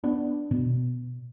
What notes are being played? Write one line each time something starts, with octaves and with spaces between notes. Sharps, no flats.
B3 D4
B2